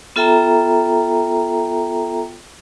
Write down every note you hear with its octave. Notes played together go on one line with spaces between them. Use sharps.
B3 F4 A4 E5 G5 A#5